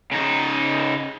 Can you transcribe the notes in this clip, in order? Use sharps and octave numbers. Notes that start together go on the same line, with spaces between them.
C#3 D#4